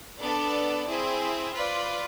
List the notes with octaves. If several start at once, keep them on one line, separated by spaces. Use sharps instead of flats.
B3 D4 A4 D5
C4 E4 G#4
F4 B4 D5